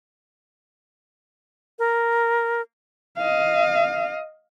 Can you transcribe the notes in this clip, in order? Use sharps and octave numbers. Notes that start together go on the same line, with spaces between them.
A#4
D#5 F5